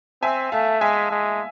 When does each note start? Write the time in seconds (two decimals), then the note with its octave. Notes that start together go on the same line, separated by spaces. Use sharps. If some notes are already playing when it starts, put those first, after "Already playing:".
0.22 C4 E5 G#5
0.52 A3 F5 A5
0.81 G#3 E5 G#5
1.11 G#3